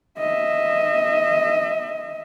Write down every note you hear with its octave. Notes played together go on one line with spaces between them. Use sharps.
D#5 E5